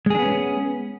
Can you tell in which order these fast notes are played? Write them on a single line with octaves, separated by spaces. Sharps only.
G#3 G#4 D4 B3 C#4